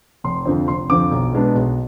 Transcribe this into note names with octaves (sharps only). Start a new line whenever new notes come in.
F1 C6
F2 D3 F3 C4
F1 C6
F2 D3 F3 C4 D6
B1
B2 G#3 B3 D4
B1